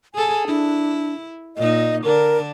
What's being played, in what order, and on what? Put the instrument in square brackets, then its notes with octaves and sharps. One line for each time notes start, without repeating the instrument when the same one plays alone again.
[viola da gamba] G#4 A4 [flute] G#5
[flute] D4 [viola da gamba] E4
[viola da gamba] A#2 D#4 [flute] D#5
[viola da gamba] D3 D4 [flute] A#4